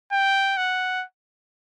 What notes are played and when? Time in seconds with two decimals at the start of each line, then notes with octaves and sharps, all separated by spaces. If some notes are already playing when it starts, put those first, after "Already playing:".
0.12 G5
0.57 F#5